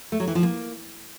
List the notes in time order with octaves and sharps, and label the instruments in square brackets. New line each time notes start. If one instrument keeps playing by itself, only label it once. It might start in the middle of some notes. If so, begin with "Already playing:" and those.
[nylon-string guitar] A3
F#3
E3
F3
A#3